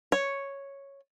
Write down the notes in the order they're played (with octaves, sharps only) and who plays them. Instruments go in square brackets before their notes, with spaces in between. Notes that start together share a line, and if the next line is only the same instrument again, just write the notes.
[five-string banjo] C#5